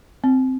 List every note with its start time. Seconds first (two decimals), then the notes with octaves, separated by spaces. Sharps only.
0.24 C4